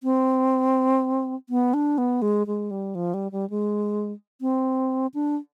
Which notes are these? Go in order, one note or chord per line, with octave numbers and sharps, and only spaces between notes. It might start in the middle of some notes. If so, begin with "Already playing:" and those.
C4
B3
D4
B3
G#3
G#3
G3
F3
G3
G3
G#3
C4
D4